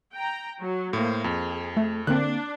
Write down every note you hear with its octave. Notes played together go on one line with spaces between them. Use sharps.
G5 A#5
F#3
A2 A#3 C5
F2 G#4
A3
D3 A#3 C4 D4 F#6